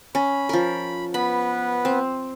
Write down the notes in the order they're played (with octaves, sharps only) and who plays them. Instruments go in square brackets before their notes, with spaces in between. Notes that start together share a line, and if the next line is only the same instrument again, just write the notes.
[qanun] C#4 [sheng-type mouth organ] B5
[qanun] F3 A#4
[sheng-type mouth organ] B3 B4 [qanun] B5
[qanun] C4